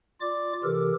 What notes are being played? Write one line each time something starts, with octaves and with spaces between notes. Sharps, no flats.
F4 D5 D6
C3 E3 G4 A4 A#4